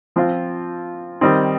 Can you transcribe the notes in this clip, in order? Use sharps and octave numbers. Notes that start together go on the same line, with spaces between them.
F3 C4 F4
D#3 G3 C4 D#4